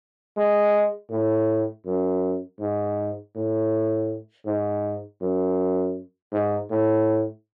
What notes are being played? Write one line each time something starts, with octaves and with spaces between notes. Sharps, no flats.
G#3
A2
F#2
G#2
A2
G#2
F#2
G#2
A2